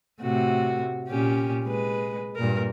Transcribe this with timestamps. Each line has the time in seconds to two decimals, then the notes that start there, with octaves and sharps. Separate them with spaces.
0.21 A2 C3 F#4
1.08 A#2 C#4 G4
1.64 G#3 B4
2.36 G2 A#2 A#4